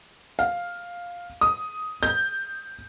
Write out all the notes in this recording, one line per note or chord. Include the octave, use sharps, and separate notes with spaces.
F5
D#6
G6